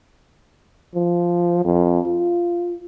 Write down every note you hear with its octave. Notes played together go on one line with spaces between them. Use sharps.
F3
F2
F4